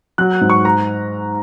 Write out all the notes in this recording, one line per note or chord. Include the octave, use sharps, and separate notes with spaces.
F#3 F#6
G#2
C#6
A#5